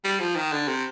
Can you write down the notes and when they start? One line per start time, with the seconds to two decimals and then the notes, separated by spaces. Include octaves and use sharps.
0.04 G3
0.20 F3
0.36 D#3
0.52 D3
0.68 C3